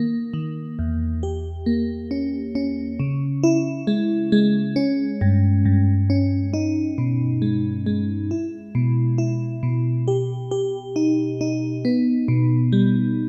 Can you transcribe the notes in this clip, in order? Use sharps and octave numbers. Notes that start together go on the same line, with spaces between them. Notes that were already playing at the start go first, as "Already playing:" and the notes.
Already playing: D#3 A#3
D#3
E2
G4
A#3
C#4
C#4
C#3
E4
G#3
G#3
C#4
G2
G2
C#4
D#4
B2
G#3
G#3
E4
B2
E4
B2
G4
G4
D#4
D#4
B3
B2
G3